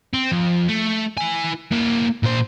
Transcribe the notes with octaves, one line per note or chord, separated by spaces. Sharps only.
C4
F2
A3
E4 G#5
A#3 E4
A#2 C5